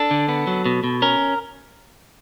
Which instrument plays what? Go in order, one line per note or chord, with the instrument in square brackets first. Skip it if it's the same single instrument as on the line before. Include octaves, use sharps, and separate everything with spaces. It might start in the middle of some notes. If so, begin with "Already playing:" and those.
Already playing: [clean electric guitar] D4 A4
D3
B3
F#3
B2
B2
C#4 A#4